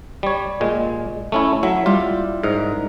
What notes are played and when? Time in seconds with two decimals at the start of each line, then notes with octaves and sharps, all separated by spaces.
0.23 G3 C#5
0.61 A#2 G#3
1.32 A3 C#4 E4
1.63 F#3 E4
1.86 G3 F4
2.43 G#2 A#4